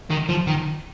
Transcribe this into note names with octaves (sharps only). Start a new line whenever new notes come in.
D#3
F3
D#3